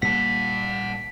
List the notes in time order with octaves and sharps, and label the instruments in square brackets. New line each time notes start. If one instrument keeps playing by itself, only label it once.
[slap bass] A#2 G3 A#3 [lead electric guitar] F#5 A5 [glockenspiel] B6